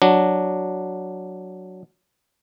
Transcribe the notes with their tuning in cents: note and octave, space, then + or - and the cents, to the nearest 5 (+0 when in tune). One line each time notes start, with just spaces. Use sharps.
F#3 +0 D4 +0